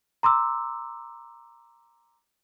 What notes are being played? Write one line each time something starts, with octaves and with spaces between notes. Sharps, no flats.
A#5 C6 D6 E6